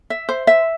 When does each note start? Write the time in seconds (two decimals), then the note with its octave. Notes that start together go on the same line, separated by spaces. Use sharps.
0.10 E5
0.29 C5
0.47 E5